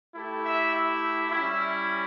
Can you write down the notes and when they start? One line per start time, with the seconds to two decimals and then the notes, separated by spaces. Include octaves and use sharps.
0.15 A3 E4 G4 A4
0.44 E5
0.74 E5
1.31 G3 C#4 E4